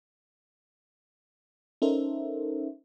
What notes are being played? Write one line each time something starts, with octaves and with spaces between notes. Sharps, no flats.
C#4 D#4 A4 A#4 C5 E5